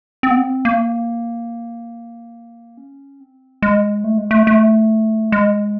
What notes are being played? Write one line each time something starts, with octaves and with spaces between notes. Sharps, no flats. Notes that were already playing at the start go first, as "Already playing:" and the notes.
C4
B3
C4
A#3
C#4
C4
G#3
A3
G#3
A3
A3
G#3